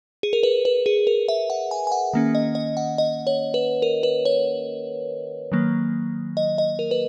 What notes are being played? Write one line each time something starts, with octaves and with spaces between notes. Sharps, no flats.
G#4
A#4
B4
B4
G#4
A#4
E5
F#5
G#5
G#5
F#5
D#3 A#3 C#4
D#5
D#5
F#5
D#5
C#5
B4
A#4
B4
C#5
D#3 F#3 A#3
D#5
D#5
A#4
B4